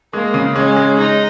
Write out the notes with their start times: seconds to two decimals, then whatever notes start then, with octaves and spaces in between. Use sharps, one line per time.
0.13 G#3 A#3
0.34 C#3
0.55 G#3 C#4
0.76 G#3
0.97 G#3 D#4